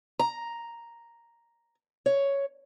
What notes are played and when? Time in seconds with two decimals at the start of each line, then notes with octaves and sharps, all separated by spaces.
0.19 A#5
2.06 C#5